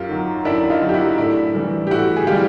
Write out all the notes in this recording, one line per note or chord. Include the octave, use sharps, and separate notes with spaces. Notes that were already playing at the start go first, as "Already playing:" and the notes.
Already playing: F#2 F4 G4
D#3 F#3
F#2 D4 E4
D#4 F4
D#3 F#3
G4
E4 F#4
A2 D4 E4
E3 G3
G4
A2 E4 F#4
G#4
E3 G3 F4 G4